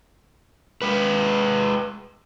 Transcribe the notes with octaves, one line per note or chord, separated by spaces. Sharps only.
G#3 B4